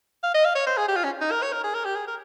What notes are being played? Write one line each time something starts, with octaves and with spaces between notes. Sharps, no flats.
F5
D#5
F5
C#5
C5
G#4
G4
F4
C#4
D#4
A#4
C#5
A#4
G#4
A#4
G4
G#4
A#4